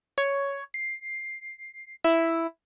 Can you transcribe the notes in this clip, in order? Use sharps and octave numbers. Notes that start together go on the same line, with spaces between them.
C#5
C7
E4